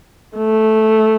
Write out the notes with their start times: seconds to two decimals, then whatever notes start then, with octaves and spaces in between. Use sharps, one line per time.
0.38 A3